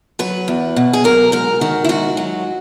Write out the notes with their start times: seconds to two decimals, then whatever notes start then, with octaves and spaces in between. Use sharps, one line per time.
0.19 F#3 B4
0.48 E2
0.76 B2
0.93 G#4
1.04 F#3 A#4
1.32 G#2 A#4
1.61 D#3 F#4
1.84 E4
1.89 G#2 F#4
2.17 F#3